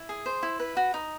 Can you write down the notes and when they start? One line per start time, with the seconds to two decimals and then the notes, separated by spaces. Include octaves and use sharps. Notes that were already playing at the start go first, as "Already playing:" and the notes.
Already playing: E4
0.09 G#4
0.26 C5
0.43 E4
0.60 B4
0.77 F#4
0.94 D#4